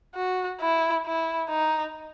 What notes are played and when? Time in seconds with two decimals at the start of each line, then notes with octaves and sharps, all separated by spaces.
0.15 F#4
0.61 E4
1.06 E4
1.50 D#4